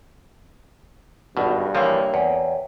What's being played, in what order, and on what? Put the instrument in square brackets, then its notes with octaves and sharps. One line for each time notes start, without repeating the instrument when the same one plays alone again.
[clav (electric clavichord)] G#1 B2 [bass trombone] G2 [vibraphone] F#5
[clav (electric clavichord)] E3 F3 [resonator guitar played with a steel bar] A#3 [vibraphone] C#5 E5 G5
[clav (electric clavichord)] E2